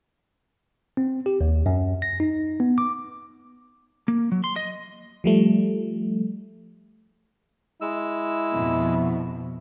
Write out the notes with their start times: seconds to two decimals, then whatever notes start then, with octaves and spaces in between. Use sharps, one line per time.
0.97 C4
1.26 G4
1.41 D#2
1.66 F#2
2.02 A#6
2.20 D#4
2.60 B3
2.78 D6
4.08 A#3
4.32 F#3
4.44 C6
4.56 D#5
5.24 F3 G3 A3
7.81 G#3 E4 E6
8.53 F2 B2